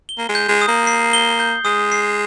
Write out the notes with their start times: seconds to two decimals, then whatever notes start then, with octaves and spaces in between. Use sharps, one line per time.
0.09 G7
0.18 A#3
0.29 G#3
0.35 G6
0.49 G#3
0.61 D#6
0.68 A#3
0.87 C7
1.13 G7
1.40 G6
1.65 G#3 D#6
1.92 C7